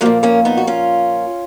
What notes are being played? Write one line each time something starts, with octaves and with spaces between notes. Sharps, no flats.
A#2 F3 F#3 A#3
A#3 C#4
B3 D#4
F#4
C#4 F4